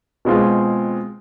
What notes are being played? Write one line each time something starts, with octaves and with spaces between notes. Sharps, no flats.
B2 G#3 C4 F4 G#4